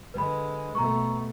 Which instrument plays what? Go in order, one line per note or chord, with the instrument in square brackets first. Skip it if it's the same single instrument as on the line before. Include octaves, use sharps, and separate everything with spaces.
[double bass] D3 G#3 [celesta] B4 B5
[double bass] B2 A3 [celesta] A#5 C#6